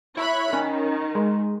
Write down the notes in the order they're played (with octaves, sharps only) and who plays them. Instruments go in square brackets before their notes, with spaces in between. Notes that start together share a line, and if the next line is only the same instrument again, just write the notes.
[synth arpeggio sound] E4 [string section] C#5 B5 F#6
[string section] D#3 [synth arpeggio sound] C#4
[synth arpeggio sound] G#3